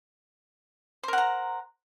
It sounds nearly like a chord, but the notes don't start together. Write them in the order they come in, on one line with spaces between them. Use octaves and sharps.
C5 A#4 F#5 A#5